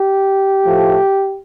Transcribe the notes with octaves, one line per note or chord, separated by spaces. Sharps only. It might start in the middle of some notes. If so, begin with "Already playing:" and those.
Already playing: G4
A2 F3 A3